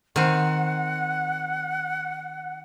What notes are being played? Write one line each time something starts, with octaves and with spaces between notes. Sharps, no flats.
D#3 C4 F#5